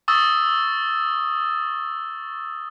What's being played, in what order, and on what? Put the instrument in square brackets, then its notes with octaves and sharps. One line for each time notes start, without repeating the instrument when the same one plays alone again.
[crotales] C#6 D#6 E6 A6